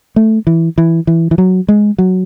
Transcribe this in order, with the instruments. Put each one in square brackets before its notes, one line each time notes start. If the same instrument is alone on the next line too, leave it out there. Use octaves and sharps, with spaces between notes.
[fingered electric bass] A3
E3
E3
E3
E3
F#3
G#3
F#3